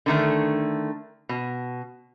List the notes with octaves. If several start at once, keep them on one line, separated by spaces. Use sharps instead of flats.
D3 D#3 A3
B2